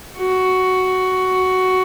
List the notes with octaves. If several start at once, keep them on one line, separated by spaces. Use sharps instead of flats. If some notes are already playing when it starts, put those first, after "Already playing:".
F#4